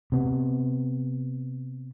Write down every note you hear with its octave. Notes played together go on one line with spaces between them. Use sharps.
C3 B3